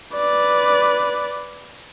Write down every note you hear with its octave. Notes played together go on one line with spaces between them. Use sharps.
B4 D5